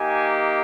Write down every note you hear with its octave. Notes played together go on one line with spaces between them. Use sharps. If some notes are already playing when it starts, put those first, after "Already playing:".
Already playing: A#3 D#4 G4 G#5